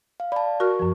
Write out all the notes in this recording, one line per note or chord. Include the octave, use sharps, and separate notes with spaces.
F5
D5 A5 B5
F#4 A#4 C#6 F6
F#2 F3